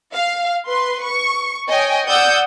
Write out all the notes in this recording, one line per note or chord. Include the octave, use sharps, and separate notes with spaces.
F5
B4 C6
C#6
C#5 D#5 G5 G#5
D5 F#5 D#6 E6 G6